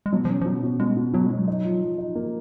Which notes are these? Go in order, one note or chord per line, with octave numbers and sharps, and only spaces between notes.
G#3
B2 F#3
F3
F#3 C#4
F3
B2 F#3
B2
B2 G#3
B2
B2 F#3
B2 G#3
F#3
D#4
F3
F3
D#4
A#3